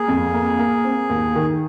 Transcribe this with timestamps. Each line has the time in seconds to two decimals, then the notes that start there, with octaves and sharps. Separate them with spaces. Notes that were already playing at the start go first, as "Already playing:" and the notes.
Already playing: A#3 G#4
0.08 F2
0.34 A#3
0.59 A#3
0.84 C4
1.10 D#2
1.35 D#3